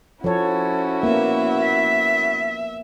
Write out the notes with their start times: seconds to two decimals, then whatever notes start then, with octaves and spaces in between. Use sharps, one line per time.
0.24 F3 C#4 E4 F#4 A4 C#5
1.03 A#3 B3 E5
1.62 B6